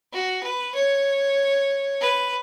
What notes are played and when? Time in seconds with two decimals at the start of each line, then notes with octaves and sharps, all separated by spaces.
0.12 F#4
0.43 B4
0.74 C#5
2.01 B4